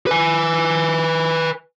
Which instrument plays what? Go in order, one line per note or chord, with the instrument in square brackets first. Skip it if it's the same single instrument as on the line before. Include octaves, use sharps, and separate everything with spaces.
[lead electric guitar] B4 G#5